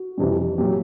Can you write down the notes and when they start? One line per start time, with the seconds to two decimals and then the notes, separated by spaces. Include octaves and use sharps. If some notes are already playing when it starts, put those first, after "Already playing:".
Already playing: F#4
0.18 F2 C3 E3 G3
0.58 A#2 F#3 G4